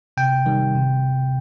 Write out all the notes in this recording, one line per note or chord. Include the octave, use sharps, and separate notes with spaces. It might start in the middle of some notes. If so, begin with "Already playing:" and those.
C3 G5
D#3 G3
C3